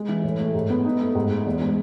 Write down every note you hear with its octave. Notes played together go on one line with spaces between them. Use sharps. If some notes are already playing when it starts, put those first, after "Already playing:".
Already playing: G#3
E3
A2
A3
G#2
B3
D#4
A3
G#2
A3
E2
G#3